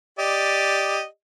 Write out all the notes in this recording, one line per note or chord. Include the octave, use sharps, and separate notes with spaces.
G4 D5 D#5